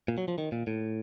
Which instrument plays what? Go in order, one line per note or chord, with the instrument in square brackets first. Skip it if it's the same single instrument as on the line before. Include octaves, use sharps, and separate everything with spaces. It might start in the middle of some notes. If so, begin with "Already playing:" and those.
[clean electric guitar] A#2
F#3
F3
D#3
A#2
A2